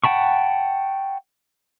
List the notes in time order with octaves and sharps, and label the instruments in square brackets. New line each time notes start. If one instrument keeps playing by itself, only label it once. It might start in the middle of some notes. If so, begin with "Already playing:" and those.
[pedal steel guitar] F#5 G5 A5 B5 C#6